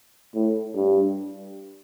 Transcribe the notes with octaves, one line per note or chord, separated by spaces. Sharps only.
A2
G2